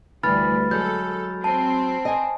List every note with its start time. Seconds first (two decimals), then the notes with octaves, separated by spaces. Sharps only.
0.23 D2 E3 G3 B5 F6 A6
0.71 F#3 G#3 A4 G6
1.44 C4 A5
2.05 D#5 G#5